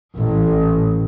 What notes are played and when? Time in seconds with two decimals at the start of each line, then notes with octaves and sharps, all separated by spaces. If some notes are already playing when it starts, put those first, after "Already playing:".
0.16 A1